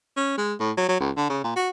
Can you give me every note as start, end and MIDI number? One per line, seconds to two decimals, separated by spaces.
0.17 0.35 61
0.38 0.54 56
0.60 0.72 45
0.77 0.88 54
0.89 0.97 54
1.00 1.11 37
1.17 1.28 50
1.30 1.43 49
1.44 1.56 46
1.56 1.70 66